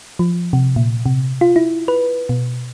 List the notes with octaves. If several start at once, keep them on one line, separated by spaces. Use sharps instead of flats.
F3
C3
A#2
C3
F4
E4
B4
B2